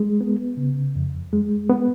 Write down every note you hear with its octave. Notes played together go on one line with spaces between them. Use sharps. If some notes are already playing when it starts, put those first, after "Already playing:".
Already playing: G#3
B3
C#3
F2
G#3
B3